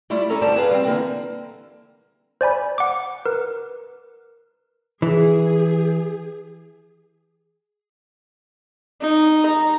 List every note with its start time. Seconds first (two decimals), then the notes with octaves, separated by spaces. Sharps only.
0.10 G3 A3 E4 F4 D5
0.30 C#4 A4 A#5
0.41 G2 D3 G3 C5 D5 A5
0.56 G#4 B4 F5
0.71 G3 B3 C4
0.86 D3 E3 A#3
2.41 C5 D5 G#5 B5
2.78 F#5 D6
3.26 A#4 B4
5.02 E3 G#4
9.01 D#4
9.46 A#5